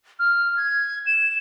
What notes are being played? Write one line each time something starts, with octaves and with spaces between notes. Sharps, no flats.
F6
G#6
E7